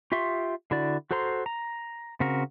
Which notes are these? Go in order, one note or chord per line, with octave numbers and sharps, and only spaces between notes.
F4 G4 E5 C6 C#6
D3 E4 F#4 D5
F#4 A4 C5 A#5 C6
A#5
C#3 C4 F#4 A#4